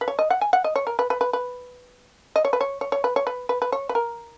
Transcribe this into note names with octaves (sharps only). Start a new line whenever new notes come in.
B4
C#5
D#5
F#5
G#5
F#5
D#5
C#5
A#4
B4
B4
B4
B4
D#5
C#5
B4
C#5
C#5
C#5
B4
C#5
B4
B4
B4
C#5
B4
A#4